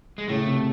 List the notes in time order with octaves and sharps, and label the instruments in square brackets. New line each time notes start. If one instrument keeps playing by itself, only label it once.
[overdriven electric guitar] G#3
[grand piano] A2 C#3 [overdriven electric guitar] A3
[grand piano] C3